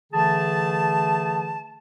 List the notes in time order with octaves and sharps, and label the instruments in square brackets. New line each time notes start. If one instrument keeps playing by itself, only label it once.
[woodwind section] D3 E3 A3 G#4 A5